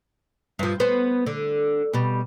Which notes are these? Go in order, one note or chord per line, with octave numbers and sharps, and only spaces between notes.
G2 F3
B3 C5
D3
B2 G3